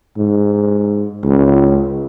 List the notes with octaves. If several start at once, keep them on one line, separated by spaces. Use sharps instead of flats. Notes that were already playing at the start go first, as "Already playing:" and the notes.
G#2
C#2